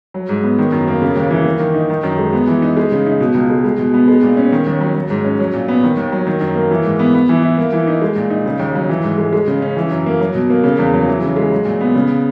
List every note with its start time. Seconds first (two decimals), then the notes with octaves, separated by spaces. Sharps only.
0.14 F#3
0.29 G#2
0.43 B3
0.58 D#3
0.72 F#2
0.88 A#3
1.02 C#3
1.16 D#2
1.31 E3
1.45 A#3
1.60 D#3
1.75 D#4
1.90 D#3
2.03 F#2
2.18 G#3
2.33 B3
2.47 E3
2.62 D#4
2.77 G#3
2.92 C#3
3.07 D#4
3.20 B2
3.34 C#2
3.50 G#3
3.64 G#3
3.79 B2
3.94 B3
4.08 G#3
4.23 A#2
4.37 C#4
4.52 D#3
4.66 D#2
4.81 F#3
4.95 F#3
5.10 G#2
5.24 C#4
5.40 F#3
5.54 A#2
5.68 B3
5.83 D#3
5.97 D#2
6.12 F#3
6.27 D#3
6.41 F#2
6.56 A#3
6.71 E3
6.85 G#2
6.99 B3
7.14 B3
7.29 E3
7.43 E4
7.58 A#3
7.72 E3
7.87 D#4
8.02 G#3
8.16 A#2
8.30 D#4
8.46 C#3
8.59 D#2
8.75 F#3
8.89 E3
9.03 G#2
9.18 G#3
9.33 G#3
9.48 C#3
9.62 C#4
9.77 E3
9.91 F#2
10.06 A#3
10.20 F#3
10.35 B2
10.50 A#3
10.64 C#3
10.78 E2
10.93 F#3
11.08 E3
11.22 C#3
11.36 G#3
11.52 F#3
11.65 A#2
11.81 B3
11.95 C#3